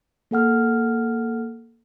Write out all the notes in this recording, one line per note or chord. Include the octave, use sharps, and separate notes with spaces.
A#3 A4 F#5 F6